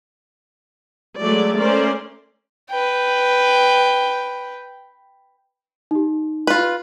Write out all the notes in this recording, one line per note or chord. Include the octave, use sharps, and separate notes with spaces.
F#3 G#3 A3 D5
A3 C#4 A#4 C5 D5
B4 G5
D#4 G4
F4 B4